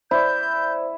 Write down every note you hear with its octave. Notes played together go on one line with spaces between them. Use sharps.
E4 C5 D5 G6